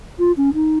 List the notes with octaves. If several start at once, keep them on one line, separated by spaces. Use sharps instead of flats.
F4
C#4
D#4